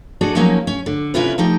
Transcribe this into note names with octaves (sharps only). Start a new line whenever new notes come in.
D4 F#4 G#4 A4 D5 D#5
F3 F#3 G#3 A#3 C#4 D#4
C#4
D3
C3 C#4 E4 F4 B4
F3 A3 D#4 G4 G5